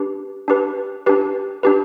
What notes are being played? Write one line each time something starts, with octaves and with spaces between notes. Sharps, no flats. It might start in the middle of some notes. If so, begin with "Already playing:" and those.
Already playing: D4 G4 B4
D4 G4 B4
D4 G4 B4
D4 G4 B4